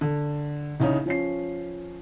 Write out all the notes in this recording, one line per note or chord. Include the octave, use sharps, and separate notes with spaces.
D3
C2 C#3 D#4 C#5
F3 C#4 C7